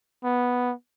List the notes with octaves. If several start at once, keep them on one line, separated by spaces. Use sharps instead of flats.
B3